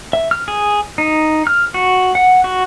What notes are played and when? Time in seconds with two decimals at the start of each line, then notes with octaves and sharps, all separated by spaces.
0.13 E5
0.31 F6
0.48 G#4
0.98 D#4
1.47 F6
1.74 F#4
2.15 F#5
2.44 F#4